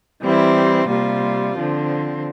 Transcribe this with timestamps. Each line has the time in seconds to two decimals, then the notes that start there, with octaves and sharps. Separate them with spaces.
0.23 E3 G3 C4 E4
0.88 C3 G3 A#3 F4
1.55 D3 F3 C4